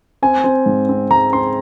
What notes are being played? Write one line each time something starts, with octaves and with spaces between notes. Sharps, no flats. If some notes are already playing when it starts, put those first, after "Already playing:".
C4 G#5
C4
G#2
C4
G#3 A#5
C4 C6